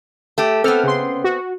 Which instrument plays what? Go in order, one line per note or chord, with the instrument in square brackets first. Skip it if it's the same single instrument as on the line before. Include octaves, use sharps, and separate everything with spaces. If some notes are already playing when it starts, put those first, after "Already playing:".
[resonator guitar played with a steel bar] A3 G4
[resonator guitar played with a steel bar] B3 C4 [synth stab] A4 F6
[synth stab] C#3 C6
F#4